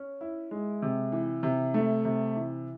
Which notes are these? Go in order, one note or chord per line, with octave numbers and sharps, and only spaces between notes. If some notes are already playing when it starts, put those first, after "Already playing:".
Already playing: C#4
E4
G#3
C3
E3
C3
A3
C3
E3